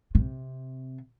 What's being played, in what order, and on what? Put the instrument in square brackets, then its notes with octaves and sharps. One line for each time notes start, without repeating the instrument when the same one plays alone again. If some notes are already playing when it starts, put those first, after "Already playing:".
[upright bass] C3